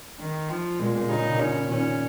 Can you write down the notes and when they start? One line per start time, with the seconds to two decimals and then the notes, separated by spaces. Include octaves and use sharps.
0.19 D#3
0.49 F3
0.79 A#2 G#3
0.95 A#2
1.09 C#3 D#4
1.31 A#2
1.39 C#3 C#4
1.69 A#2 D#3 C#4